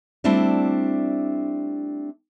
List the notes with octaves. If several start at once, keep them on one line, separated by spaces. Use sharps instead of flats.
G3 A3 C4 D4 E4